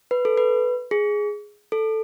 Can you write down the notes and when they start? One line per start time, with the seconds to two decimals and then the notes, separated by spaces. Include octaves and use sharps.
0.11 B4
0.25 A4
0.38 B4
0.91 G#4
1.72 A4